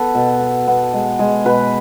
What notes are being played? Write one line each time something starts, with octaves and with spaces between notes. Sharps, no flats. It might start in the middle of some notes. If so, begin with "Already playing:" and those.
Already playing: B3 A4 B4
B2
B3
B3
G#3
G#3
B2 B4